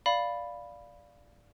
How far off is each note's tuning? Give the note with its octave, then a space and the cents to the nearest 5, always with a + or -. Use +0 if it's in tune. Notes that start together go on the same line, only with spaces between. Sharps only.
D5 +0 F5 +0 B5 +0